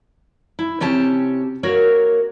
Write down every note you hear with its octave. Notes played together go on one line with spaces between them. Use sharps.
E4
C3 C#4 G4 A5
A#3 F#4 A#4 C#5